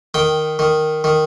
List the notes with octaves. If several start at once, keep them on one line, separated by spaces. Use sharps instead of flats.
D#3 G5
D#3
D#3